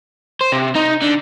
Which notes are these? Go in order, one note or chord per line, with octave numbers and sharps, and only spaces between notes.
C5
C3
D#4
D3